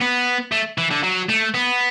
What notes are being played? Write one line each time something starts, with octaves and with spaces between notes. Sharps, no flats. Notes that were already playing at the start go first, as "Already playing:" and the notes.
B3
A3
E3
D3
F#3
A3
B3